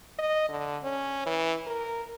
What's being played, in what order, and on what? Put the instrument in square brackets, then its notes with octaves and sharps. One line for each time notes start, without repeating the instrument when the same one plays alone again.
[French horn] D#5
D3
C#4
E3
A#4